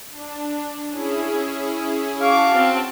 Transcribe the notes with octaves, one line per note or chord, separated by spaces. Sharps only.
D4
C#4 E4 G#4
F#4 F5 A5 C#6 D6
C4